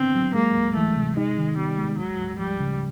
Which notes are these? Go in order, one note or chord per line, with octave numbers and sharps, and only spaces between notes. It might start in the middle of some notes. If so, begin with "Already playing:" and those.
Already playing: D3 D#3 B3 C4 D4
F#3
G#3 A#3
D2
E3 A3
C3
G#3 D#4
D#3
G3 B3
G#3
D2 F#3
D2
F3 G3
C#3